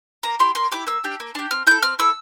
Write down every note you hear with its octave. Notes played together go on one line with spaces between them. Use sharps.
A#3 A#5
E4 G4 C6
A#3 C6
E4 G4 D6
A#3 E6
D4 G4
A#3
D4 G4
C4 F6
E4 A4 G6
C4 F6
E4 A4 E6